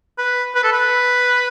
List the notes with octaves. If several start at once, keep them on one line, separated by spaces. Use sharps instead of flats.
B4
B4
A4
B4